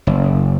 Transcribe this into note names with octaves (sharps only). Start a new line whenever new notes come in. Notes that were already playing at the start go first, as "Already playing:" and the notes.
F#1